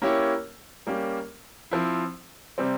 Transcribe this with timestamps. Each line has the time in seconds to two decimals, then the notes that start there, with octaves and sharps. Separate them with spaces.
0.02 A#3 C#4 E4 G4 C#5
0.87 G3 A#3 C#4 G4
1.71 F3 C4 E4
2.58 C3 G3 C4